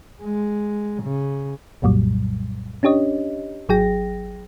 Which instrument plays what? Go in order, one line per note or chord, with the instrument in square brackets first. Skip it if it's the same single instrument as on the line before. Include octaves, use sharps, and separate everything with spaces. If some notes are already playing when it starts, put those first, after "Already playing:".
[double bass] G#3
C#3
[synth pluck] C2 F#2 A#2 F#3 G3
C#4 D4 G4 C#5 D#5
G#1 F#3 G#4 G5 A#6